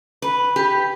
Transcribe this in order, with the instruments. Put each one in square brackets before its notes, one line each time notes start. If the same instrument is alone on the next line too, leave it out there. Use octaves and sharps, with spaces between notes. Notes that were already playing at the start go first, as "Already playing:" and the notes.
[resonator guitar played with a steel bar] B4
G4